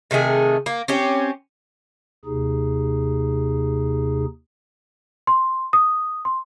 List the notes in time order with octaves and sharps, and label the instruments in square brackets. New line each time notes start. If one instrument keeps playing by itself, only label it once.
[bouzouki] C3 D#3 A3 G#4
A#3
C4 C#4 G4
[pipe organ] D#2 C3 D#4 G#4
[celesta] C6
D#6
C6